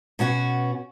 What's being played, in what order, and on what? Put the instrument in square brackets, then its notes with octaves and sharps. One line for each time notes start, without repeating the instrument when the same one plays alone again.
[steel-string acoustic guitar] B2 C#4 F#4